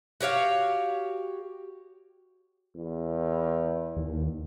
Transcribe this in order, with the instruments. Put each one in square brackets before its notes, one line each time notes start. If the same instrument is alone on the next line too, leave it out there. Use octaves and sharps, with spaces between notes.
[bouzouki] F#4 G4 C#5 F5
[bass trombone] E2
[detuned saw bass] D#2